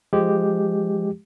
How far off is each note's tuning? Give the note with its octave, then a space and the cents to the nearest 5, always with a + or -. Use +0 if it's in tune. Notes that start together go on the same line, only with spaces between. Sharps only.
F3 -5 G#3 +0 G4 +0